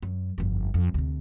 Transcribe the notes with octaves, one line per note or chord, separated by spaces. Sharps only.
F#2
G1 F2
F2
D2 C3